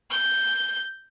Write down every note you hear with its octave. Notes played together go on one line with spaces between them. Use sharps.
G6